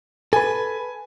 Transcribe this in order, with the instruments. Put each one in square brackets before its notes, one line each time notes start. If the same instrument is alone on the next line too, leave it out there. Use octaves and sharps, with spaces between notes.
[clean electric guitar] A4 B4 [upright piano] G#5